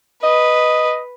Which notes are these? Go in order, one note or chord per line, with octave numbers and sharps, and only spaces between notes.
B4 D#5